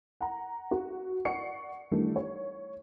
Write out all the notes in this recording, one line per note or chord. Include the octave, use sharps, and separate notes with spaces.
F#5 A#5
F#4
D5 F#5 C#6 C7 C#7
D#3 E3 G3 A3 D4
C#5